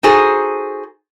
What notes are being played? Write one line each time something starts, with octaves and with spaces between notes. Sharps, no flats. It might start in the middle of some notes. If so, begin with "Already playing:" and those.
D#4 F#4 G#4 A4 C5